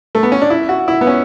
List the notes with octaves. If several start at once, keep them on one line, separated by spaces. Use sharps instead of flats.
A3
B3
C#4
D4
E4
F#4
E4
B3
C#4